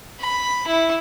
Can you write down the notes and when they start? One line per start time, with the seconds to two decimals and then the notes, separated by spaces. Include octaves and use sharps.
0.20 B5
0.67 E4